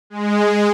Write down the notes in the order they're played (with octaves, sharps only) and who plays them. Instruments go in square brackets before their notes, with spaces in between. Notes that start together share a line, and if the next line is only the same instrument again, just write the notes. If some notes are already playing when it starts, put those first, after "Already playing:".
[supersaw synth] G#3